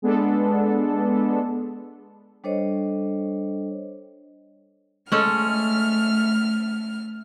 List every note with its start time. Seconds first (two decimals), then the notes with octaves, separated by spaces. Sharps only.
0.02 G#3 B3 D4 A4
2.44 G3 D4 A4 C5 C#5 D#5
5.12 G#3 A3 C#4 A4 F6